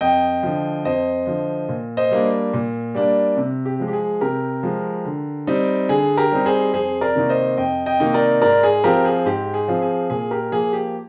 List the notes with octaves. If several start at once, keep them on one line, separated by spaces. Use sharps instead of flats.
F2 D#5 G5
D3 F3
F2 C5 D#5
D3 F3
A#2
C5 D#5
G3 A#3 D4
A#2
G3 A#3 D4
C3
G4
F3 G#3
G4
G#4
C3 G4 A#4
F3 G#3
D3
G3 C4 D#4
D3 G#4
G4 A#4
G3 C4 D#4
G#4 C5
F2 G#4 C5
A#4 D5
C3 D#3 A#3 D#4
C5 D#5
F2 D#5 G5
D#5 G5
C3 D#3 A#3 D#4
A#4 D5
G#2 A#4 D5
G#4
F3 C4 F4 G4 A#4
G#4
G#2 G4
G#4
F3 C4 F4
G#4
A#2 G#4
G4 A#4
F3 A#3 G#4
G4